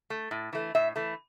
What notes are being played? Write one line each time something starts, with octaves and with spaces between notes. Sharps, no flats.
A3
A2
E3 A3
A2 E5
E3 A3